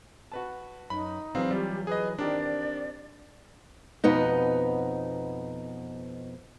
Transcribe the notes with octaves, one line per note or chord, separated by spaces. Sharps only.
F#4 B4 A5
F#2 D#4 B5
E3 F#3 C4 G#4 B4 D5 F5
G3 F4 G4
G#4 B4 D#5
D#3 C4 D4 G4 A#4 D5
F2 B2 B3 D#4